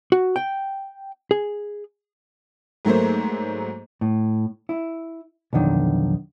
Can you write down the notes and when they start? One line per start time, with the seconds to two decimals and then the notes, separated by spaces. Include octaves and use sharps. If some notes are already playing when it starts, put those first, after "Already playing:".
0.12 F#4
0.36 G5
1.31 G#4
2.85 G#2 F#3 A3 A#3 C5
4.01 A2
4.69 E4
5.53 B1 F2 D3 D#3